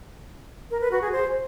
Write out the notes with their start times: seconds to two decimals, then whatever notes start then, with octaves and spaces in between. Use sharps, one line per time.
0.71 A#4
0.81 B4
0.91 F#4
1.02 G#4
1.12 C5